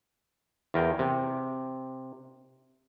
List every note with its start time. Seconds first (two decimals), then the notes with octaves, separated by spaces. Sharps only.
0.74 E2 A#4 G5
0.99 C3